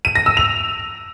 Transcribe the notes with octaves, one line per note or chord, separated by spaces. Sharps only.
D#7
A#6
E6
F7